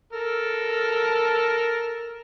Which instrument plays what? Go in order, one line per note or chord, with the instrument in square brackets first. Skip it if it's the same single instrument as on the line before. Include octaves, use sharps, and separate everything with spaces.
[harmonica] A4 A#4